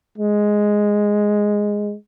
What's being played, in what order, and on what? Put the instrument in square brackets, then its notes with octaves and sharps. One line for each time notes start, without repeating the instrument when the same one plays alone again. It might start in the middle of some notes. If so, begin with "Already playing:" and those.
[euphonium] G#3